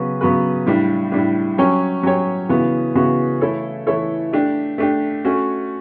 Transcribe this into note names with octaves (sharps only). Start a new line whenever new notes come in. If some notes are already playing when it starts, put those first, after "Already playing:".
Already playing: C#3 F#3 B3 F#4 B4
C#3 F#3 B3 F#4 B4
A2 G3 D4
A2 G3 D4
F#3 C#4 G4 C#5
F#3 C#4 G4 C#5
C#3 E3 B3 F#4
C#3 E3 B3 F#4
E3 A3 E4 A4 C#5
E3 A3 E4 A4 C#5
A3 D4 G4
A3 D4 G4
A3 C#4 F#4